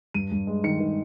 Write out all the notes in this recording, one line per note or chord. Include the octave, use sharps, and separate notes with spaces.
G2 D#7
G2
G#3
D#3 C#7
D#3